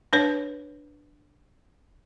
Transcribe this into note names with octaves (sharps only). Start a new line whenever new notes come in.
D4 B4 C#5